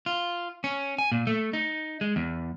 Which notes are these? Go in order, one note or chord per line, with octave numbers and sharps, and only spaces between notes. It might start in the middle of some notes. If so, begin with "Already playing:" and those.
F4
C#4
G#5
A#2
A3
D#4
G#3
E2